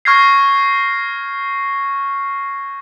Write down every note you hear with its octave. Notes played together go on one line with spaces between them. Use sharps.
C#6 F6 G6 G#6 A#6 C7